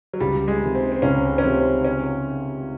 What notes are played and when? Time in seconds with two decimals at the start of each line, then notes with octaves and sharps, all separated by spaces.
0.13 F#3
0.20 C#2 G3
0.48 G#3
0.61 C3 D#3
0.75 C4
0.91 C4
1.02 C#2 C#4
1.38 C#4
1.44 C3 D#3 C4
1.85 C#4